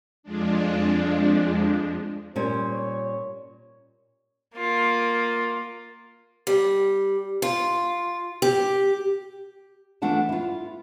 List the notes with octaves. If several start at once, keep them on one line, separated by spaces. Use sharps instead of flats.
F2 F3 G#3 D4
A#2 G3 C#4 C5
C#5
A#3 F4
G3
F4
G4
E3 A3 D4 F4 F#5 A5
E4 F4